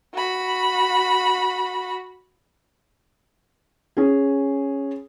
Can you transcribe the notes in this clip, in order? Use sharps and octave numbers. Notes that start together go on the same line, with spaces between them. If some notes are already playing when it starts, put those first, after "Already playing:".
F#4 B5
C#4 G#4